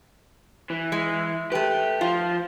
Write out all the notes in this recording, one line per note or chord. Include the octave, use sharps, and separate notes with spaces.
E3
G#3
A3 G4 B4
F3 F4